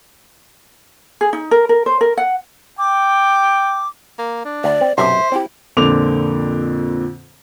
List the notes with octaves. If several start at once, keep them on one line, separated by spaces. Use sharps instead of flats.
G#4
D#4
A#4
A#4
C5
A#4
F#5
G5 D6
A#3
D4
D2 D5
C4
B1 F#2 C3 C5 E5
C4 E4 G4
F2 A#2 D3 C4 D6 F7